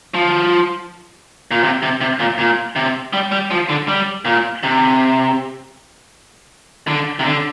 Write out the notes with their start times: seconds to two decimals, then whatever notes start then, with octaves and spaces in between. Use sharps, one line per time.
0.14 F3
1.51 A#2
1.63 C3
1.82 C3
2.01 C3
2.20 A#2
2.38 A#2
2.76 C3
3.13 G3
3.32 G3
3.51 F3
3.69 D3
3.88 G3
4.25 A#2
4.63 C3
6.87 D3
7.19 C3
7.25 D3